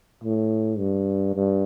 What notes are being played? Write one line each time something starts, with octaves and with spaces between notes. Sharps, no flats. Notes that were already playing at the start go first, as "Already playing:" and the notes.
A2
G2
G2